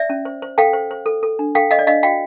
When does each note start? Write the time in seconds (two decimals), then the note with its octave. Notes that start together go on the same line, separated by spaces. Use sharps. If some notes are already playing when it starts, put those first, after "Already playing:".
Already playing: D5 E5
0.10 C#4
0.25 C5
0.42 C5
0.58 A4 F5 G5
0.73 C5
0.91 C5
1.06 A4
1.23 A4
1.39 D4
1.55 A4 F5 G5
1.71 A4 D#5 F5
1.79 D5
1.87 D4 D#5 F5
2.03 F#4 F5 G5